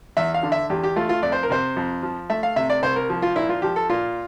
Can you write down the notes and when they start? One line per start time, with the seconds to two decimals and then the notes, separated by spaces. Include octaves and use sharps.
0.17 E2 E5
0.34 F5
0.43 D3
0.52 E5
0.70 E2 G4
0.83 G4
0.96 A3 F4
1.09 F4
1.23 F2 D5
1.32 C5
1.43 A#4
1.50 C3 C5
1.76 F2
2.03 F3
2.30 A3 E5
2.43 F5
2.56 C3 E5
2.69 D5
2.83 C2 C5
2.96 A#4
3.10 F3
3.22 F4
3.36 A#2 E4
3.49 F4
3.62 F3 G4
3.76 A4
3.89 A#2 F4